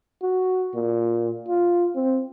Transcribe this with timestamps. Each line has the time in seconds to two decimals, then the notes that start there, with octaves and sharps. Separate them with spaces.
0.22 F#4
0.74 A#2
1.48 F4
1.95 C4